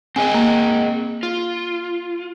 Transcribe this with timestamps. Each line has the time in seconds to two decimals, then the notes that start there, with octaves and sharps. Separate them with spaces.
0.16 C4 G#4 D#5 G#5
0.34 A#3
1.23 F4